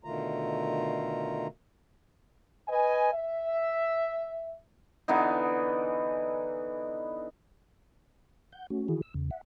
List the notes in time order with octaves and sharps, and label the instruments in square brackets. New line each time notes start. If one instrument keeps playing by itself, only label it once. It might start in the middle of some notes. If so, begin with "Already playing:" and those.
[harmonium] B2 D3 D#3 A3 F4 A#5
[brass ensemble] B4 D#5 G#5
E5
[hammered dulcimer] D3 E3 B3 D#4
[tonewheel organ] F#5 G6
A3 C#4 F#4
D#3 E3 E4 F#4 G#4
E6
E2 C#3
E5 F#5